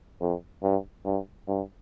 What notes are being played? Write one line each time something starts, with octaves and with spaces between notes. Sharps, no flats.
F2
G2
G2
G2